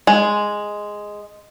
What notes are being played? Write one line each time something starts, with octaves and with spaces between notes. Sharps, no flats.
G#3